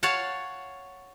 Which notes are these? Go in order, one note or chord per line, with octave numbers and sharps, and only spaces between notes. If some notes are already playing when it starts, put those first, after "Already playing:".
C#5 F5 F#5 A5